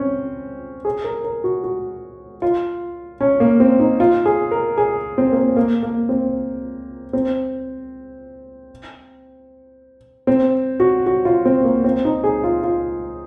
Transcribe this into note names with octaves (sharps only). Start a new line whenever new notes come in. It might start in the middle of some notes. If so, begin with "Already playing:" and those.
Already playing: C4 C#4
G#4
A#4
A#4
F#4
F#4
F4
C#4
A#3
C4
D#4
F4
G#4
A#4
G#4
C4
A#3
C4
A#3
A#3
C4
C4
C4
F#4
F#4
F4
C4
A#3
C4
D#4
G#4
F4
F4